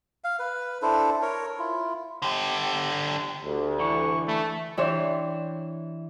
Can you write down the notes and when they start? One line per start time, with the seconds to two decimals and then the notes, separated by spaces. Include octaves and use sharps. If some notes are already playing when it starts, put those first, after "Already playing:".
0.24 F5
0.39 B4
0.82 D4 E4 A4 C5
1.22 A#4 C#5
1.59 E4 F4
2.22 D3 G4
3.43 D2 G4
3.79 D3 E3 C#6
4.28 A3 B5
4.77 E3 D4 G4 C#5 E5 C6